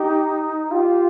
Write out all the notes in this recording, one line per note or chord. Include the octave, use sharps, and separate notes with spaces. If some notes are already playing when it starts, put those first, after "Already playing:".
Already playing: D#4 G4
F4 G4